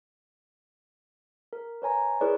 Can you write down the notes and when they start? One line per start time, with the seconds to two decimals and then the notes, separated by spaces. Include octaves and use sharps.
1.53 A#4
1.82 B4 C#5 G#5 A#5
2.21 E4 G#4 A#4 B4 C#5 D5